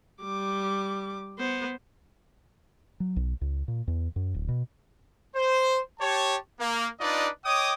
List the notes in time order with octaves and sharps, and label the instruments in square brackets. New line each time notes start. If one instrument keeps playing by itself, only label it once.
[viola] G3 D6
B3 C5
[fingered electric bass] F#3
B1
C#2
A#2
E2
F#2
D1
B2
[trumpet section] C5
G4 C#5 A5
A#3
D4 D#4 F4 B4 D5 D#5
C#5 D#5 G5 D6 D#6